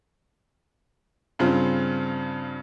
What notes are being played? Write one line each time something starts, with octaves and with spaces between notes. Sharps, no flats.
G2 C#3 C4 F4